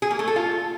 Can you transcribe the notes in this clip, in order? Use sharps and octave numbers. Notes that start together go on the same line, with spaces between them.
G#4
A#3
A3
A4
F4